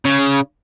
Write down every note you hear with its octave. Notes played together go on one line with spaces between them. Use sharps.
C#3